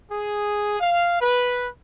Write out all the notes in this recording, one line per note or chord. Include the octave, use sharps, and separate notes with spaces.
G#4
F5
B4